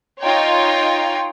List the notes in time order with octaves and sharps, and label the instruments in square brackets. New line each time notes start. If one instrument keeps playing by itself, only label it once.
[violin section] D#4 F4 C#5 G5 A#5 C6